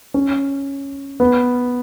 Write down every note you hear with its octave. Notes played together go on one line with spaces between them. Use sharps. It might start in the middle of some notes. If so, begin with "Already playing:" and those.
C#4
B3